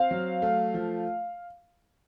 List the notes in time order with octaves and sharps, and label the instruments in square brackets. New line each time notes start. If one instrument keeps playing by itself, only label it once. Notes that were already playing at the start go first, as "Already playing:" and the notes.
Already playing: [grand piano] C4 [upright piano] F5
[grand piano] F#3
A3
F3